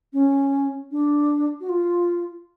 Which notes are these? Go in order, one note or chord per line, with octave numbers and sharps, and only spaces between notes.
C#4
D4
F#4
F4